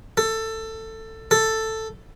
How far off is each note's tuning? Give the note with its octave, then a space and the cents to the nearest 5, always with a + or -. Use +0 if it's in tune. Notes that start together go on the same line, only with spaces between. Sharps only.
A4 +15
A4 +5